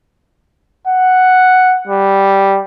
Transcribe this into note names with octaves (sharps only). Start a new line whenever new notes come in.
F#5
G3